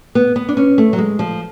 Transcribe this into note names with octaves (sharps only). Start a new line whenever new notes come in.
B3
B3
D4
C#4
A3
F#3
G#3
F3